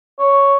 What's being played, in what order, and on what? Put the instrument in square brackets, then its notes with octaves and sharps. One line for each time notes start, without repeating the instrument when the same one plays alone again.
[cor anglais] C#5